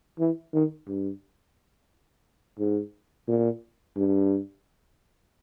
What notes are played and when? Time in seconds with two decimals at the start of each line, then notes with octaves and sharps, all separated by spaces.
0.19 E3
0.54 D#3
0.88 G2
2.59 G#2
3.28 A#2
3.96 G2